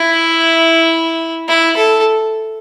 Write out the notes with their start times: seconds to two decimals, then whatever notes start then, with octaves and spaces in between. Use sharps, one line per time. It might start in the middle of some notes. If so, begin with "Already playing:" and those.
Already playing: E4
1.48 E4
1.77 A4